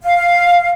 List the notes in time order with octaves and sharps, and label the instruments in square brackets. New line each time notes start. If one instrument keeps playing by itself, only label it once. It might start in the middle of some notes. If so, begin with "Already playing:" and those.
[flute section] F5